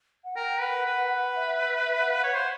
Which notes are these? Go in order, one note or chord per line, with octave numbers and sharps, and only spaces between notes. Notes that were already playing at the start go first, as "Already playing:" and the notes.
F#5
A#4 G5
B4 F#5
B4
E5
E5
F#5
F5
F#5
C#5
C5